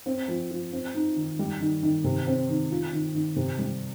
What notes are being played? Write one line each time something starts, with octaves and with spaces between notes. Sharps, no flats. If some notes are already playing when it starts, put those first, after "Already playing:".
C4
F3
F3
C4
D#4
D#3
G3
D#3
D#3
C3
C4
D#3
F4
D#3
D#3
C3
G3